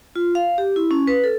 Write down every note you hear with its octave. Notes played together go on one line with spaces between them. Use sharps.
F4
F5
G4
E4
C#4
B4
A4